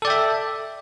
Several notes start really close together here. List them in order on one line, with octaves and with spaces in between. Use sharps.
A4 D5 G5 E5